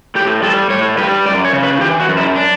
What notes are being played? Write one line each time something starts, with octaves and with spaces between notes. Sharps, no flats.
A2 G4
G3 A4
A2 C#5
G3 B4
F#2 D5
C#5
C#3
B4
E3 G4
F#4
F#2
E4
D4